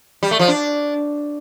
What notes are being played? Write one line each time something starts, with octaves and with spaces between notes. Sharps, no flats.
G3
A3
F3
D4